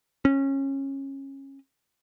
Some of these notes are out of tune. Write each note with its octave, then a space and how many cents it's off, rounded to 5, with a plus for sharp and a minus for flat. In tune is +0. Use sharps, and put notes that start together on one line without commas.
C#4 -20